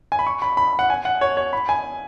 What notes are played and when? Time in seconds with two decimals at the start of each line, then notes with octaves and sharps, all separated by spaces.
0.12 G#5
0.19 B5
0.27 C#6
0.42 B5
0.57 B5
0.79 F#5
0.90 G#5
1.05 F#5
1.21 C#5
1.37 C#5
1.53 B5
1.69 G#5